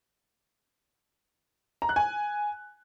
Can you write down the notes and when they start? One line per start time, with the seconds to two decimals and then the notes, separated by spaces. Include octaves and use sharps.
1.82 A#5
1.89 F#6
1.96 G#5